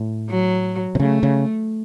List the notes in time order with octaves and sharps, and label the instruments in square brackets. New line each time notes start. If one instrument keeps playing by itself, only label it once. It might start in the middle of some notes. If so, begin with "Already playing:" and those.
Already playing: [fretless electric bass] A2
[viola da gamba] F#3
[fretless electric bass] C3
[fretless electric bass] C#3 [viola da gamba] A3
[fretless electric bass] C#3